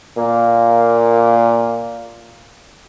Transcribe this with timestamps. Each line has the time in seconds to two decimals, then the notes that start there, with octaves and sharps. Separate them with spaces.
0.18 A#2 A#3